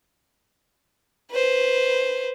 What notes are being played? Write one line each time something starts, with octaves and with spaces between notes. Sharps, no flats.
B4 C5